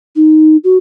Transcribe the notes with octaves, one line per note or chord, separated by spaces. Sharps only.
D#4
F#4